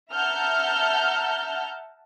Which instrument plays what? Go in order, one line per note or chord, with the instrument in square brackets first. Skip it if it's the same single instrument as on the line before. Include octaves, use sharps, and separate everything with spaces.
[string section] E5 F#5 A5 A#5 F6 G6